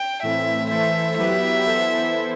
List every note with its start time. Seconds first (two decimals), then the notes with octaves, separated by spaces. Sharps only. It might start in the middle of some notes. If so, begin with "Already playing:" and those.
Already playing: G5
0.23 A2 E3 A3 C4 E4 E5
0.70 E3 A3 E4 A4 C5 E5
1.18 F#3 B3 E4 G4 B4 E5
1.66 E3 B3 E4 A4 C5